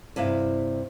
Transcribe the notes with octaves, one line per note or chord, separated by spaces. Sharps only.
G2 C3 E4 F5